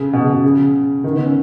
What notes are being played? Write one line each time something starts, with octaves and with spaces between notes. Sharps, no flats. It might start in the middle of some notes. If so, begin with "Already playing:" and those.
Already playing: C#3
B2
C#3
B2
C#3
D#3
B3
C#4